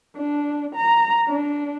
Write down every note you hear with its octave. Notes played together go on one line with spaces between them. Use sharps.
D4
A#5
D4